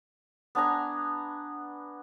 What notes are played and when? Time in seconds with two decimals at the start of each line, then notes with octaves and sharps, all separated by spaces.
0.55 B3 D4 G#5 A#5